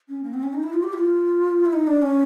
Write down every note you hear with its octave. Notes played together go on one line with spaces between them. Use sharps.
C#4
A#3
C4
C#4
D#4
E4
F4
G4
E4
F4
E4
D#4
D4
C#4